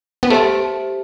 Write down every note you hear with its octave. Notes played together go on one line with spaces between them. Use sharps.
B3
A3 G4 C5 E5 A5